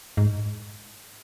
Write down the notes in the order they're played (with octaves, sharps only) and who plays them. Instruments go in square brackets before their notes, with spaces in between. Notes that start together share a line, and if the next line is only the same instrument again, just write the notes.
[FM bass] G#2